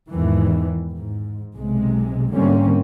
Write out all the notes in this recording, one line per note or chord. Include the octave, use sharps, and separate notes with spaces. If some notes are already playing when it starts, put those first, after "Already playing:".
E2 G#2 D#3 E3
G#2
B1 C3 G#3
G#2 D3 G3 A#3 C4 C#4